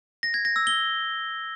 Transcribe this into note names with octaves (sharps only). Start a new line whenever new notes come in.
A#6
G#6
A#6
E6
G7